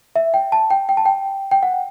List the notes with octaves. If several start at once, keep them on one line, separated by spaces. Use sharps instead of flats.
E5
G5
A5
G5
G5
A5
G5
G5
F#5